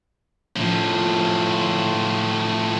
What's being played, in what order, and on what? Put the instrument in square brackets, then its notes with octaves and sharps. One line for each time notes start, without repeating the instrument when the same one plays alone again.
[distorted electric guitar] A2 F3